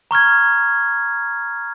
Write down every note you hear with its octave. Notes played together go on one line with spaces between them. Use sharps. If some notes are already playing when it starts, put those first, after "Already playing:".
A#5 C#6 F6 G#6